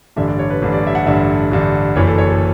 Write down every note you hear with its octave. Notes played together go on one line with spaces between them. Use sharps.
A1 G2 D3 E5
D5
C#5
B4
A1 G2 D3
D5
E5
F#5
A1 G2 D3 E5
A1 G2 D3
F#1 F#2 E3 C#5
A4
C#5
A4